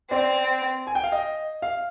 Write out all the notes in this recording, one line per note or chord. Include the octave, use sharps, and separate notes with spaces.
C4 D5
G#5
G5
F5
D#5
F5